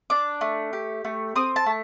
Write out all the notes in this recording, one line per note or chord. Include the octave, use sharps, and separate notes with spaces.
D4 D6
A3
G4
A3
C4 D#6
A5
A3